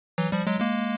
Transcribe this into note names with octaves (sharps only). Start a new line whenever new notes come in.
E3 F#3
F3 G3
F#3 G#3
G#3 A#3